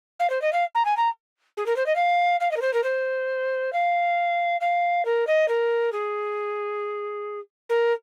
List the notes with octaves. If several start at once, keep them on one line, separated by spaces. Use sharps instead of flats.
F5
C5
D#5
F5
A#5
G#5
A#5
G#4
A#4
C5
D#5
F5
F5
D#5
A#4
C5
A#4
C5
F5
F5
A#4
D#5
A#4
G#4
A#4